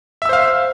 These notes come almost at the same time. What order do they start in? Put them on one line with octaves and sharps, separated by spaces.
E5 E6 C5 F5